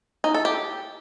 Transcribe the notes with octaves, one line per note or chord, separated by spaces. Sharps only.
D#4
A4
G4